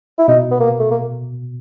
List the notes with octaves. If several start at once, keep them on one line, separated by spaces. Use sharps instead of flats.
E4
B2 D#4
B3
A#3
A3
A#3